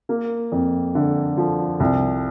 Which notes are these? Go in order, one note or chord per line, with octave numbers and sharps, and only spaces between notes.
A#3
F2
D3
F3
C2